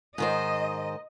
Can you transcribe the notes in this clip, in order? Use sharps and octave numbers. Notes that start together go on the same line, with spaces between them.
G#2 D#3 C5 D#5